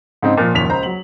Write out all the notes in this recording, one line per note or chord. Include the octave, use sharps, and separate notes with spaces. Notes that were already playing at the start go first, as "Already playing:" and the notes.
G#2 C#3 C4 D#4
A#2 F3
F#1 D#2 F3 B6 F7
C#2 C5 A#5
F#3 F#7